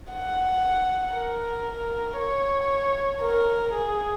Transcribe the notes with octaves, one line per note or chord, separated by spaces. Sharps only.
F#5
A#4
C#5
A#4
G#4